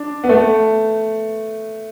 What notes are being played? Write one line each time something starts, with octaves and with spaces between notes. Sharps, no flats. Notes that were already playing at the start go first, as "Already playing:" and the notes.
Already playing: D4
B3
A3